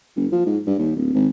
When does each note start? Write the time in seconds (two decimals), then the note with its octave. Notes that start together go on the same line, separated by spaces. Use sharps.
0.16 F#1
0.32 F3
0.46 G#2
0.67 G2
0.79 D#2
0.96 D1
1.14 G#1